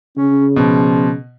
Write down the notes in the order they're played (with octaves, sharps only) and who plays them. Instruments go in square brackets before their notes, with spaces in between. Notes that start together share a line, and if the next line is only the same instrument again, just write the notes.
[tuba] C#3 [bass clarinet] C#4
[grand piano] B2 [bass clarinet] F3